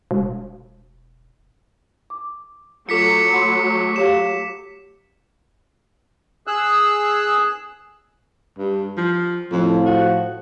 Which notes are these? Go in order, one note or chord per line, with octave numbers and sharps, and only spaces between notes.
E1
D6
F#3 A3 F4 A4 D6 B6 C#7
F#5 B5 C6
G4 C#5 F5 E7
G#4 E6 F#6
G2
F3
F2 A2 F3
F#4